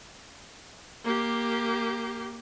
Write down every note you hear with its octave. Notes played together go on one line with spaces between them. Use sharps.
A#3 G4